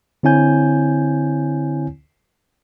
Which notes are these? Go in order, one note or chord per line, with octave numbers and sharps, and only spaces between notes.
D3 C4 E4 C#5 G#5 G6